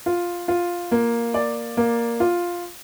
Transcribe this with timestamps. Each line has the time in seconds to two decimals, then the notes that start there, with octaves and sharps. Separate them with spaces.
0.06 F4
0.48 F4
0.92 A#3
1.34 D5
1.77 A#3
2.20 F4